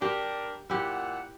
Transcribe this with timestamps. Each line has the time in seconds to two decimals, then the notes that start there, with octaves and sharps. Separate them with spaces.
0.02 G3 D4 G4 A#4
0.70 A#2 E4 G4 E5 F#5